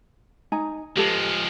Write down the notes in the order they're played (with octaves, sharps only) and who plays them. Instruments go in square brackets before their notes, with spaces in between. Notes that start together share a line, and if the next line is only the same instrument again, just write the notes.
[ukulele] D#4 G#5 A#5
[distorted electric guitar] F3 G#3 [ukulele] G4 A4 B4